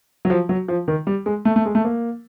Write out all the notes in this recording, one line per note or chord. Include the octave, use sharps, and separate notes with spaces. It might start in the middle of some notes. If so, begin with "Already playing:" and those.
F#3
F3
F#3
F3
D#3
G3
G#3
A3
A3
G#3
A3
A#3